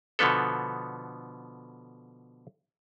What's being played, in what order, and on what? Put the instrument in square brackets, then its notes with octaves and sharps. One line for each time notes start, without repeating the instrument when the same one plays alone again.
[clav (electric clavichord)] B2 D3 F3 B3 A4